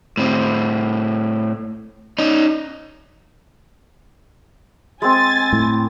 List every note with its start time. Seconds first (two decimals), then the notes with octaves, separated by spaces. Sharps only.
0.17 A2 C4
2.18 C#4 D#4
5.02 G#3 C4 G#5 A6
5.53 A2